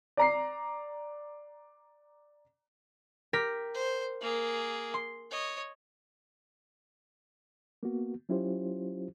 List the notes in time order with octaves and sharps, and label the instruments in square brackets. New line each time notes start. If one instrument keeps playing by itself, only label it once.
[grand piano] D5 A#5 C7
[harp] G4 A#4 B6
[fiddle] C5
A#3 G#4
[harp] C6
[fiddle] C#5 D#5
[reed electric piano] A#3 B3 F#4
F#3 C#4 E4 F4 G4 C5